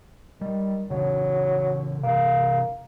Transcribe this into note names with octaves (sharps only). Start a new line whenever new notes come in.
D#3 G3
C#3 E3 F#3
C3 E3 A#3